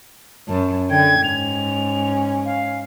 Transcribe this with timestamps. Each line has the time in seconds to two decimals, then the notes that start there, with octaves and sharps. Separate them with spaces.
0.48 F#2 A5
0.90 D3 G5 G#6
1.24 G#2 C#4 F7
2.45 F5